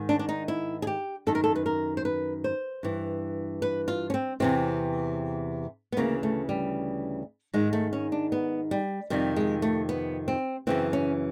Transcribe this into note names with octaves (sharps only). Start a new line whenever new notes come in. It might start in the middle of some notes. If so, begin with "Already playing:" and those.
Already playing: G#2 D#3
D4
D4
D#4
E4
G#4
G4
F#2 D#3 A4
A#4
A4
B4
A#4
C5
B4
C5
G2 E3
B4
F4
C#4
C4
E2 C3 E3 C4
B3
D2 C#3 E3 A#3
A3
G3
G#2 D#3 G#3
A3
C#4
D4
B3
G3
F2 C3 D#3 G3
G#3
A3
B3
C4
F#2 C#3 E3 C4
C#4